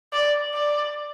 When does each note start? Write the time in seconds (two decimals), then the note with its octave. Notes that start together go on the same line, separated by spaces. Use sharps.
0.13 D5
0.54 D5